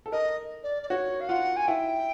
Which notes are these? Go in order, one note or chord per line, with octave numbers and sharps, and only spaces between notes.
A4
A#4 D#5
D5
D5
F#4 C#5
F5
F4 F#5
G#5
E4 G5